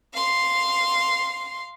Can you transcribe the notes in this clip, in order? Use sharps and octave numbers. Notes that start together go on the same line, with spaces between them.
F5 C6